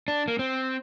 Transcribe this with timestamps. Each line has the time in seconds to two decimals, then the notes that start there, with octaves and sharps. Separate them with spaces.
0.08 D4
0.28 A#3
0.39 C4